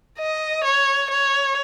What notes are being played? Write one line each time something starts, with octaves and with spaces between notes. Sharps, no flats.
D#5
C#5
C#5